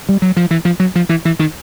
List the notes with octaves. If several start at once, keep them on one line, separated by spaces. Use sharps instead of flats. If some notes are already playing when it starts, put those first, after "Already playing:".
G3
F#3
F3
E3
F3
F#3
F3
E3
E3
D#3